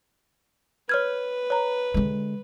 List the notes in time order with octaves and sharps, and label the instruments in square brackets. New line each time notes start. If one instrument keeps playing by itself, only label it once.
[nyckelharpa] B4 [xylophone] C#5 F6 G#6
[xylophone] C#5 A#5
[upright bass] D3 G#3